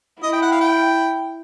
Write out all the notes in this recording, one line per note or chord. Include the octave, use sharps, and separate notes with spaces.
E4 D#5
G5
F#5
F5
G5